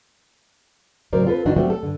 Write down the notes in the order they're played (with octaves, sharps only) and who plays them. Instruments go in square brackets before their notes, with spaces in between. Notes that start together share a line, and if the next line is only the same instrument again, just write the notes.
[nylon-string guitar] A2 C#3 F#3 A#4 C5 D5
C4 F4 A4 B4
G2 D3 E3 D4 D#4 F#4
F#3 G3 A3 B3 C4 F#4
A4
G2 D3